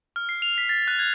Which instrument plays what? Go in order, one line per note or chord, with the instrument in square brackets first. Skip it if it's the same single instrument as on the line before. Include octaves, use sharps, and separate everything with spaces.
[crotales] F6
C7
F7
B6
A6
F#6
G#6